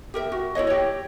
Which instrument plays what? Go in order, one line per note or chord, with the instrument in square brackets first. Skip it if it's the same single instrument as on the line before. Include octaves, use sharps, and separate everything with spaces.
[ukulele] G4 A#4 E5
F#4
E4 G#4 C#5 D#5
G4 C#5